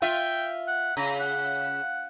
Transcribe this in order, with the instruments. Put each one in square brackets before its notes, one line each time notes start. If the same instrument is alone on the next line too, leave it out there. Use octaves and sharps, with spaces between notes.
[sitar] F4 E5 [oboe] G5
[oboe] F#5
[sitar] C#3 [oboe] A#5
[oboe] F#5